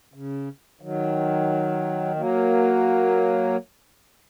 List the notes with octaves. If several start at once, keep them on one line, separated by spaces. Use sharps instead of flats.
C#3
D#3 F#3
F#3 A#3